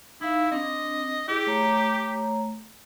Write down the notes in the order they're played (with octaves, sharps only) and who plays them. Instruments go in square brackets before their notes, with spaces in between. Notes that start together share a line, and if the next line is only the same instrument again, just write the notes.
[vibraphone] D#4 F5 [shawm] E4
[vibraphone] C4 D4 [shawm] D#5
[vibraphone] E4 G#4 [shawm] G4
[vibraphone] A3 C#5 A#5